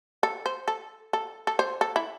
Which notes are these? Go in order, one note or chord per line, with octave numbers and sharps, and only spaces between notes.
A4
C5
A4
A4
A4
C5
A4
E4